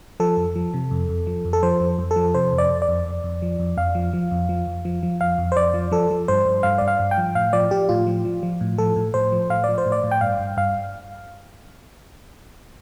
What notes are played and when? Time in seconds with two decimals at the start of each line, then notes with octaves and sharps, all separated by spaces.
0.20 F3 A4
0.37 F2
0.55 F3
0.74 C3
0.91 F2
1.09 F2
1.27 F3
1.45 F2
1.53 A4
1.63 F3 C5
1.80 F2
1.99 F2
2.11 A4
2.16 F3
2.34 C3 C5
2.53 F2
2.58 D5
2.70 F2
2.82 D5
2.88 F2
3.06 F2
3.24 F2
3.42 F3
3.60 F2
3.77 F2 F5
3.95 F3
4.13 F3
4.31 F2
4.49 F3
4.67 F2
4.85 F3
5.03 F3
5.21 F2 F5
5.38 F2
5.52 C5
5.56 F2 D5
5.74 F3
5.92 F3 A4
6.11 F3
6.28 G2 C5
6.46 G2
6.63 G2 F5
6.78 G2 D5
6.88 F5
6.99 G2
7.11 G5
7.18 F3
7.35 A2 F5
7.53 F3 D5
7.71 F3 G4
7.89 A2 F4
8.07 F3
8.25 F3
8.43 F3
8.61 A2
8.78 F3 A4
8.96 A2
9.14 A2 C5
9.32 F3
9.50 A2 F5
9.64 F3 D5
9.78 C5
9.86 A2
9.92 D5
10.04 A2
10.11 G5
10.21 G2 F5
10.39 G2
10.57 G2 F5